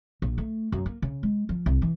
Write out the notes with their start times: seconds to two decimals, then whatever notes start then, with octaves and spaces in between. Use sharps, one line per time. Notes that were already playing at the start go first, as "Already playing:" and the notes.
0.22 A#1
0.38 A3
0.72 F#2
0.86 A#3
1.02 C#3
1.23 G#3
1.49 F3
1.66 C2
1.82 E3